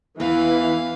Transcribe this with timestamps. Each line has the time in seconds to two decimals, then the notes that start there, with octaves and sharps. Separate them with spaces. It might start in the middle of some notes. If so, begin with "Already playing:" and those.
0.20 E2 E3 B4 F5